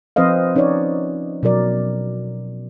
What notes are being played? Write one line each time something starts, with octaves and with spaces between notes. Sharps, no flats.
F3 C4 B4 C5 D#5 F5
C#4 D#4 B4 C#5 D5
B2 F#3 A#4 D5